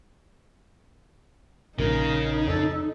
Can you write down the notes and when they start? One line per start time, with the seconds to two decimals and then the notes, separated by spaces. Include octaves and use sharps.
1.78 A#1 C#3 D#4 A#4
2.48 F2 A4